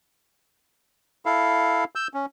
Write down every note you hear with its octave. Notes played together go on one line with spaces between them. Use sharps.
E4 A4 F5
E6 G6
C#4